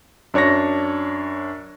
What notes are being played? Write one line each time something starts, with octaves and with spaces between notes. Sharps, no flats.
F#2 D4 C#5 C#6 A#6